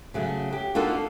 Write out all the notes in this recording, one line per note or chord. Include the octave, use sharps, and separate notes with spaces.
C#3 F#3 A3
G4
A#3 D4 D#4 F4 F#4 A4